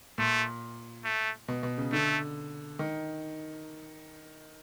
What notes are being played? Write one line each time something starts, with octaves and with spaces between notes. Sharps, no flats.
A#2 A3
A3
B2
B2
C#3
D3 A3
D#3